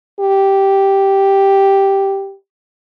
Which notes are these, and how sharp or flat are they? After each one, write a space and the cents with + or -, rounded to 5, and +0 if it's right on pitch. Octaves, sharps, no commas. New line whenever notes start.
G4 -5